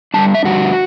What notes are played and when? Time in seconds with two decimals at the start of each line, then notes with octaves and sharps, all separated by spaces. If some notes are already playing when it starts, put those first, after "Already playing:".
0.14 G2 D3 G3 D4 A5
0.35 E5
0.44 G2 D3 G3 D4 F#4